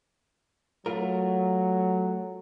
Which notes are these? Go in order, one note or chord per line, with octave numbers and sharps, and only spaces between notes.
F#3 A3 F4 A#4